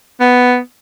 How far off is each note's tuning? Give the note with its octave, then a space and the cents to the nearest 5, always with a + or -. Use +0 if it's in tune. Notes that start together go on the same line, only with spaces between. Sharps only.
B3 +5